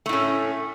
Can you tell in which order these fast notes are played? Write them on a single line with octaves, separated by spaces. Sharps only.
A3 A2 C#4